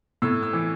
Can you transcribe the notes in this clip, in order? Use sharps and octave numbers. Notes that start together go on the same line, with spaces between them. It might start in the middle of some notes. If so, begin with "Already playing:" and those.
A2 E6
E6
E3